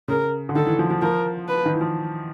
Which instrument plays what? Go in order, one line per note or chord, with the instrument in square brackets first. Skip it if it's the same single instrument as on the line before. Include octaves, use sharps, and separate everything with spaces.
[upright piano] C#3 [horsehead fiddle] A#4
[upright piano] D3
[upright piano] D#3 [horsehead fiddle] A4
[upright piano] E3
F3
F3
[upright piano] F3 [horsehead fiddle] A#4
[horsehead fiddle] B4
[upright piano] D#3
E3
F3